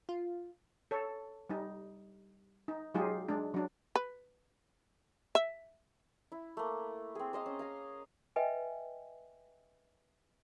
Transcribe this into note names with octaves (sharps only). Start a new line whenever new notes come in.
F4
A4 C#5
G3 D#4
D#4
F#3 G#3 D#4 F4 G4 G#4
G#3 D4
F#3 D4
B4
E5
E4
A3 A#3
C4 G#4
C5 D#5 F5
C#4
F5 G#5 A#5
B4 D#5 E5 G5 G#5